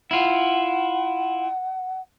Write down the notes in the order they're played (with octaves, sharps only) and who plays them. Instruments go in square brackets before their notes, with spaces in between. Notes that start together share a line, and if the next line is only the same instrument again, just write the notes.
[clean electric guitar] E4 F4 [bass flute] F#5